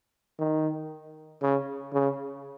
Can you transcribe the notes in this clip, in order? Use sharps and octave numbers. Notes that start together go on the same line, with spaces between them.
D#3
C#3
C#3